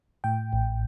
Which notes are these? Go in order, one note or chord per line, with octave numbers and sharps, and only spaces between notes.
A2 G5
A1